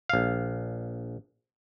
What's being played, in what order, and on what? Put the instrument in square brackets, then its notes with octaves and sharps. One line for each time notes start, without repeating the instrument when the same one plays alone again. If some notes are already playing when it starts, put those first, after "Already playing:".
[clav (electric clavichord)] A#1 F5